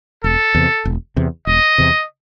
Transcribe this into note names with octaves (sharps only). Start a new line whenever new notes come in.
E1 A4
E2 C3
E1
E2 C3
E1 D#5
E2 C3